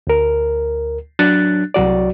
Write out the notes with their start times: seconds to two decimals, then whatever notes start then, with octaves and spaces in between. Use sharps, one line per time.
0.07 D2 A#4
1.19 F#3 D4 F#6 A6
1.74 C2 F#3 F#4 D5